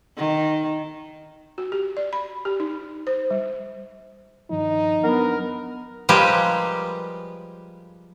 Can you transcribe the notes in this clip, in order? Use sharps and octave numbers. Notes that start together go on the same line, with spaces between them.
D#3
F#4
G4
D5
B5
G4
D#4
C5
G3
G2 D#3 F3 D#4
F#3 B3 D4 A#4 F#5
F3 G3 G#3 G4 A#4 B4